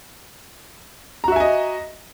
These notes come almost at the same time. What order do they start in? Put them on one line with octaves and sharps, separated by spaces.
A#5 F#4 E5 G#5 D#5